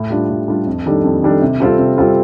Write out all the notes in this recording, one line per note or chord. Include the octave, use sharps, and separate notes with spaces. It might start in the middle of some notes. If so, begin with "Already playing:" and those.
Already playing: A2
G3 D4 F4
A2
G3 D4 F4
F2
D#3 G3 D4 A4
F2
D#3 G3 D4 A4
C3
G3 C4 F4 A4
C3
G3 C4 F4 A4